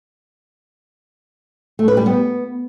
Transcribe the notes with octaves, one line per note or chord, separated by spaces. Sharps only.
A3
B4
G3
B3